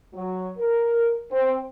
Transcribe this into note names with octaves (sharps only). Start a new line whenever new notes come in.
F#3
A#4
C4